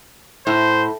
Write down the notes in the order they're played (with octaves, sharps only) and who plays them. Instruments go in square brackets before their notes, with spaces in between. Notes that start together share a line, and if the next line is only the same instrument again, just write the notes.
[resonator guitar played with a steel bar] A2 [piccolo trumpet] C5